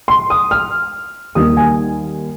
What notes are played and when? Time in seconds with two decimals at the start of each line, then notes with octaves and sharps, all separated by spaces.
0.08 C6
0.30 D#6
0.51 F6
1.35 D#2 D#3 G3 A#3 D#6
1.57 G#5